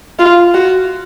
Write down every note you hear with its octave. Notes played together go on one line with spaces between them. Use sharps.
F4
F#4